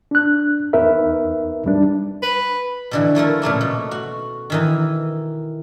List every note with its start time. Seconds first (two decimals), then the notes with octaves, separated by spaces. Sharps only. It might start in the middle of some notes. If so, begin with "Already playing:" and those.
0.11 D4 F#6
0.73 E2 B3 D#4 A#4 B4 E5
1.66 G3 D4
2.23 B4
2.91 B2 D3 E3
3.15 F3 A3 E4 A#4
3.42 A#2 C#3 A3 A#3
3.61 B2
3.91 F#4
4.50 D#3 E3 D#4